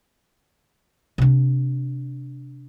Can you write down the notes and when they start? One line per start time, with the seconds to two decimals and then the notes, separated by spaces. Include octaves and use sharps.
1.18 C3 D4